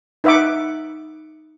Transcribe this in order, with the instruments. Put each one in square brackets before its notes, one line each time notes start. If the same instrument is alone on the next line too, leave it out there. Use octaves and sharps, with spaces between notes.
[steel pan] D#4 B4 E5 F#5 D6